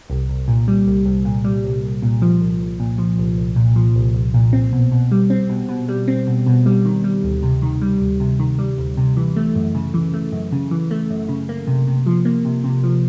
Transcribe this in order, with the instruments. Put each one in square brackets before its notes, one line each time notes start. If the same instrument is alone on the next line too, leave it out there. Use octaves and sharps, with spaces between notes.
[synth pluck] C2
C2
A#2
G3
C2
C2
A#2
G3
C2
C2
A#2
F3
C2
C2
A#2
F3
C2
C2
A#2
F3
C2
C2
A#2
C4
B2
B2
G3
C4
B2
B2
G3
C4
B2
B2
G3
D#3
G3
D2
C3
D#3
G3
D2
C3
D#3
G3
D2
C3
E3
A3
F#2
C#3
E3
A3
F#2
C#3
E3
A3
F#2
C#3
A#3
C3
C3
F3
A#3
C3
C3
F3